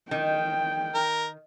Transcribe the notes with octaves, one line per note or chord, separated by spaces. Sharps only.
D#3 G5
A#4